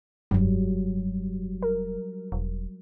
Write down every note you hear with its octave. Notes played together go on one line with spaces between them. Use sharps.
F1 G2 F#3 G3
A#4
E1